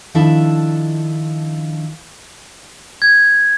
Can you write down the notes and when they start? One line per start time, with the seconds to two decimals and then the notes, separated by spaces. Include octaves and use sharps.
0.15 D#3 F3 D4 E4 A4 E5
3.02 G#6